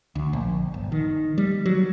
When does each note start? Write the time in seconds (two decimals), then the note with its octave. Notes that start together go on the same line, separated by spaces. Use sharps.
0.15 D2
0.33 A#1
0.74 G1
0.92 D#3
1.38 G3
1.66 F#3